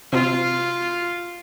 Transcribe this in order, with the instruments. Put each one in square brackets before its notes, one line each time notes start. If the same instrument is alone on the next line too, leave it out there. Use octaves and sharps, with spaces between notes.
[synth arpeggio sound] C3 [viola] F4